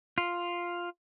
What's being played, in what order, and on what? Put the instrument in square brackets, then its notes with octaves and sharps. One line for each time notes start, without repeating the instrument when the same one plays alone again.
[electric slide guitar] F4